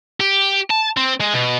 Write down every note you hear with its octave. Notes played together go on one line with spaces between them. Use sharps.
G4
A5
C4
G#3
B2